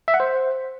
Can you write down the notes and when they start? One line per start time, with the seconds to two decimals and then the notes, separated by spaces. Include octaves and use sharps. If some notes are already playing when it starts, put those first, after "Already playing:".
0.08 E5
0.14 F#5
0.20 C5